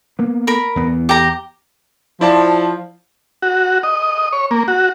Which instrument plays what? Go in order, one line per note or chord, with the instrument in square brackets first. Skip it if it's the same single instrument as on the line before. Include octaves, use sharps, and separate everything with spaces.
[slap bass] A#3 B3
[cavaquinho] A#4 B5
[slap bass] E2 B3
[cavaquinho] G4 A#5
[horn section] F3 [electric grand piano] E4 D5 A5
[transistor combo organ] F#4
D#5
C#5
A#3
F#4